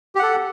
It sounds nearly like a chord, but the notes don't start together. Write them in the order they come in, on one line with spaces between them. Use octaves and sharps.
G4 F#5 A4